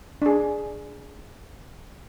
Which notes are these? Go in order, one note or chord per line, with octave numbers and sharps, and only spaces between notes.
D4 G#4